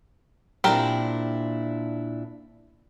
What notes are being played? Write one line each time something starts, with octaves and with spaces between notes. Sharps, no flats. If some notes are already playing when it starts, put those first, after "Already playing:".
A#2 C4 D4 E4 G4 A#4